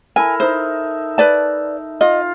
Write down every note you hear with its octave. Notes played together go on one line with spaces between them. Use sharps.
E4 A4 A#4 G#5
D#4 C5 E5
B4 D5 A5
F4 D#5